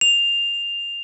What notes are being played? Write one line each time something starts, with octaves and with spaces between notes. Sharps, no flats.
F7